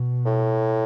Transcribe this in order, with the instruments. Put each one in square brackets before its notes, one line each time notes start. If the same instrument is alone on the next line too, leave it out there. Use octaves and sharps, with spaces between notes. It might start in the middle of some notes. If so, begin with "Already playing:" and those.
Already playing: [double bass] B2
[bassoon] A2